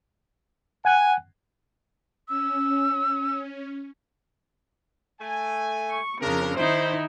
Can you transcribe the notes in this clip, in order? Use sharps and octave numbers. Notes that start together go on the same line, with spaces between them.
F#5 G#5 F#6
C#4 E6
A3 G#5
C#6
F2 C#3 D4 A#4
D#3 D#4 E4 C5